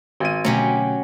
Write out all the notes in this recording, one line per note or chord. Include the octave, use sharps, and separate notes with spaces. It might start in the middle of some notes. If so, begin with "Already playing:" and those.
G#1 D#7
B2 D3 F#3 A3 C#4 G4